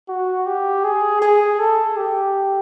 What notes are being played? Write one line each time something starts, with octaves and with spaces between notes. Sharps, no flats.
F#4
G4
G#4
G#4
A4
G4